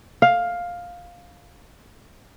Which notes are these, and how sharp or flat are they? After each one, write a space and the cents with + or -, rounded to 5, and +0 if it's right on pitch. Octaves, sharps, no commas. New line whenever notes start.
F5 +10